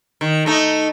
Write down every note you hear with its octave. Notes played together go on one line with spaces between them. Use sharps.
D#3
A3 D#4